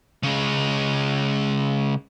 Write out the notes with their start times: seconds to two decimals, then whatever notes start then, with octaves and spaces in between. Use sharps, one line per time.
0.23 C#3 G#3